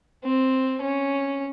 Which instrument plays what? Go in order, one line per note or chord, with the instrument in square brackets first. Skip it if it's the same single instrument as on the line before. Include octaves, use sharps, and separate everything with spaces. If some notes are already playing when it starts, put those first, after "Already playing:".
[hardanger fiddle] C4
C#4